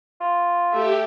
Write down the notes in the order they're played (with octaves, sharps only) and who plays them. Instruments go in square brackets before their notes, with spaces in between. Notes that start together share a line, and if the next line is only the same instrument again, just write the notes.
[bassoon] F4
[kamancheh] A3 E5 [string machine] G4